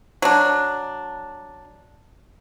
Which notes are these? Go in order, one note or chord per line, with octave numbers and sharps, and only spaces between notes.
F#3 D4